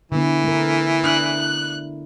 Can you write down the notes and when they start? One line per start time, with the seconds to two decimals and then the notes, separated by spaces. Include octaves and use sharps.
0.12 D3 E3 B3
0.44 A3 A#4
1.03 D4 E4 F#6